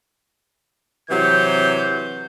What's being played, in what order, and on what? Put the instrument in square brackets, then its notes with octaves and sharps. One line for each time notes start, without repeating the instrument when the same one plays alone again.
[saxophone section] C3 E3 F#3 [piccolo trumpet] G6